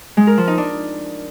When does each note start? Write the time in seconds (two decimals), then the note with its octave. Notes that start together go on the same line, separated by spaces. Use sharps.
0.17 G#3
0.27 A#4
0.37 F3
0.48 D#4
0.58 D4